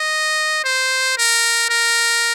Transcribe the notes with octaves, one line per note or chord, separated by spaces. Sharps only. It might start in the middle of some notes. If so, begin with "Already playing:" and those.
Already playing: D#5
C5
A#4
A#4